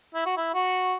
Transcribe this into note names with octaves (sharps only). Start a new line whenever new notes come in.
E4
F#4
E4
F#4